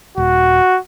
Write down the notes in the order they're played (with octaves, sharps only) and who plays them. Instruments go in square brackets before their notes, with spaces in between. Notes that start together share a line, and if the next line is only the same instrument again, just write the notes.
[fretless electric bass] D#1 [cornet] F#4